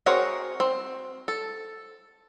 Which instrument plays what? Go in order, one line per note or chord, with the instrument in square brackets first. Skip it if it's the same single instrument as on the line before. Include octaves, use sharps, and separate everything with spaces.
[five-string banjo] C4 F#4 G#4 A#4 C#5
C4
A4